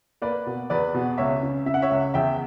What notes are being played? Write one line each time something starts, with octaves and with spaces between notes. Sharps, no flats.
A#3 B4 D5
B2
E2 B4 D5
B2
C#2 C#5 E5
C#3
C#3 E5
F#5
C#5 E5
C#2
E2 E5 G5